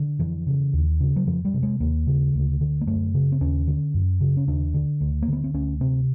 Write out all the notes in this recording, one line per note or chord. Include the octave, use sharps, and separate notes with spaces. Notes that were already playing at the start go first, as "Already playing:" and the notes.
Already playing: D3
F2 E3
C#3
D#2
C#3
F#3
F2 F3
G3
C3
G#3
D#2 A#3
C#3
D2
D3
A#3
F#2 A3
C#3
C4
D#2 C#4
D3
F#2
C#3
C#4
D#2 D4
D3
D2
A#3
D3 B3
C4
D2 C#4
C3 C4